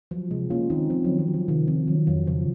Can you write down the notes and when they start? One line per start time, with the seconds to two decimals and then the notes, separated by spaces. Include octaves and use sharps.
0.11 F3 F#3
0.31 C3 G#3
0.50 A#3 C#4 F4
0.70 D#3 C4 D#4
0.90 F3 C4
1.04 D#3 F#3
1.19 F3
1.28 F#3
1.34 F3
1.48 C3 D#3
1.68 F3 C4
1.88 D#3 F#3
2.07 F2 F#3
2.27 C#3 F3